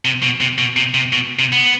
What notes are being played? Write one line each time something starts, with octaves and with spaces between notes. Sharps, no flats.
C3
B2
C3
B2
C3
C3
B2
C3
B3